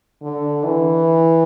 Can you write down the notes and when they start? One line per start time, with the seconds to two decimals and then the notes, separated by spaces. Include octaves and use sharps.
0.22 D3
0.64 E3